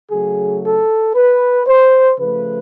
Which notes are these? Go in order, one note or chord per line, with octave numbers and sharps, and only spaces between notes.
C#3 F#3 A3 G#4
A4
B4
C5
C#3 F3 A3 B4